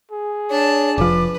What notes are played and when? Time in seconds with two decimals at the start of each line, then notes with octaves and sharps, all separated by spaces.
0.12 G#4
0.50 D4 C#5 A5
0.98 F1 F3 B4 D6